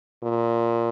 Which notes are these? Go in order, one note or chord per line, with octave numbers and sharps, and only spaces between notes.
A#2